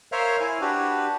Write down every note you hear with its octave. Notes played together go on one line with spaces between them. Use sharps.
A#4 C5 C#5 E5 F5 F6
E4 G#5
D4 F#4 G4 B4